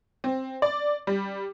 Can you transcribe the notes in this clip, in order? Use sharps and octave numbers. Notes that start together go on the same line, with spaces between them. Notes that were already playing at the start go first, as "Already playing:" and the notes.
C4
D5
G3